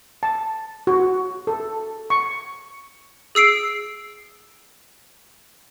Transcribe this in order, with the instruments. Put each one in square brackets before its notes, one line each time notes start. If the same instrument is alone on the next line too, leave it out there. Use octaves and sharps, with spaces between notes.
[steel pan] A5
F#4
A4
C#6
[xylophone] G#4 E6 C7 D7